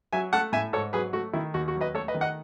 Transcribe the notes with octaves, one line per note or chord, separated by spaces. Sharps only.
F#3 E5 G#5
A3 F#5 A5
A2 E5 G#5
G#2 A4 C#5
F#3 G#4 B4
A3 F#4
D#3 E4
D#2 F#4
F#4
F#3
B4 D#5
A3 A4 C#5
B4 D#5
D#3
D#5 F#5